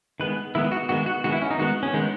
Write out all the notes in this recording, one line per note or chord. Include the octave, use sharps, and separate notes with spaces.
D#3 G#3 B3 B4
D#3 G#3 B3 E4
F#4
D#3 G#3 B3 F#4
F#4
D#3 G#3 B3 F#4
E4
C#4
D#4
D#3 G#3 B3 F#4
C#4
D#3 G#3 B3 D#4